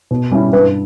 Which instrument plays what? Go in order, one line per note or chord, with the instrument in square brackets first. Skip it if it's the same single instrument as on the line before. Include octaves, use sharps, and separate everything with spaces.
[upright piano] B2
G3 C#4 E4
[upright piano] G2 [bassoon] E3